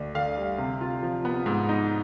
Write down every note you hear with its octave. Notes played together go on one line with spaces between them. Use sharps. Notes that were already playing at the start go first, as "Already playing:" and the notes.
Already playing: D2 D4
D3 F5
G3
C3
F4
F3
B3
G#2
D#4